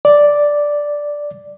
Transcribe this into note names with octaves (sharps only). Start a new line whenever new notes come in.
D5